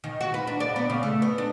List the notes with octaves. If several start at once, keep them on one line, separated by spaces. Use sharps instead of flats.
D#3
F#4
B4
D4
D5
B3
C#3
A3
B3
D4